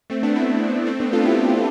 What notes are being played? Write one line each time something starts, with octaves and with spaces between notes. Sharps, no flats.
A3 C4
B3 D4
C4 E4
A3 C4
B3 D4
F4 A4
E4 G4
E4 G4